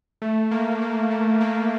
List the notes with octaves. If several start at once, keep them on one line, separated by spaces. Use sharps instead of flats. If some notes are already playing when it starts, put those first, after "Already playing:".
A3
A#3
A#3
A3
A#3